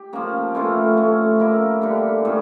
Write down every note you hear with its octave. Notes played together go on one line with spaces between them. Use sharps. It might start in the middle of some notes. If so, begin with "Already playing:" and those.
Already playing: G4
F3 A#3 C#4
E3 A3 C#4 F4
F3 A3 C#4
A#3 C#4 E4 A#4
D3 G3 D4 G4
A2 E3 G3 C#4